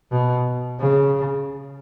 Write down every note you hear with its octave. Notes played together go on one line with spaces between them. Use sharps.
B2
C#3